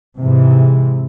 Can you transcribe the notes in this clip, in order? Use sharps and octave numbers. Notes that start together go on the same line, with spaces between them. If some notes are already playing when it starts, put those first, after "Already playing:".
G#2 C3 E3